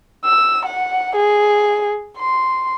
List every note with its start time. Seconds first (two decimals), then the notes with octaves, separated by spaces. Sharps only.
0.24 E6
0.66 F#5
1.16 G#4
2.18 C6